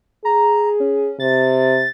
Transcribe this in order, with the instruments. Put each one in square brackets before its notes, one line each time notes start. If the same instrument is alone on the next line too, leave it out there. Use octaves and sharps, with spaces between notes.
[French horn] G#4 [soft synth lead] A#5
[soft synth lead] C#4
[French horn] C3 [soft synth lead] A6